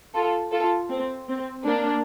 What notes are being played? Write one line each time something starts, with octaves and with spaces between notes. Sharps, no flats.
F4 A4
F4 A4
C4
C4
A#3 D4